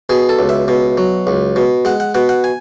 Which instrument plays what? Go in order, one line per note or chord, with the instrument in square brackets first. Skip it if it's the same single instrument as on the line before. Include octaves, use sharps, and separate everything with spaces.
[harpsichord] B2 G#4
A4
C#2
E5
B2
F#3
C#2
B2
G#3 F#5
F#5
B2 F#5
F#5
G#5